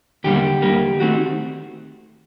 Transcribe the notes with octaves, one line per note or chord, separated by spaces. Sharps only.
D#2 D3 G3 A#3 G4
D#2 D3 G3 A#3
D#3 A3 C4 F#4